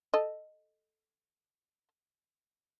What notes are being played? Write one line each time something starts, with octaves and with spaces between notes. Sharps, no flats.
A4 D#5